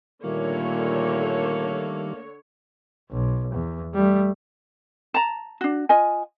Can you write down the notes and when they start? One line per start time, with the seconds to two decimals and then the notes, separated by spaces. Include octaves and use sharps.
0.24 A#2 D3 D#3 G3 A3 A#3 C#5
3.11 B1
3.54 E2
3.94 G3 A3
5.14 A5 A#5
5.61 D4 F#4
5.89 F4 D#5 G#5